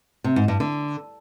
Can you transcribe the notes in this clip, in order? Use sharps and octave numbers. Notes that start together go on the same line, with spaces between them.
C3
G#2
G2
D3